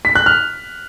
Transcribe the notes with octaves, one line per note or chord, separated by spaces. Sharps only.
B6
F#6
F6